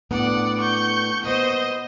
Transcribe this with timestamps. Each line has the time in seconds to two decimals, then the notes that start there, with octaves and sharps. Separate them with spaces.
0.11 A2 B3 D4 D5 F#5
0.60 C#6 G6
1.24 A#2 B3 C5 D#5